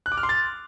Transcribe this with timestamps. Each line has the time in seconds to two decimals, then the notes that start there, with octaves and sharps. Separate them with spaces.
0.06 F#6
0.12 D6
0.17 F6
0.23 C6
0.29 A6